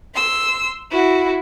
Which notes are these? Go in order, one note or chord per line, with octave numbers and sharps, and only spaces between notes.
C6 E6
E4 F#4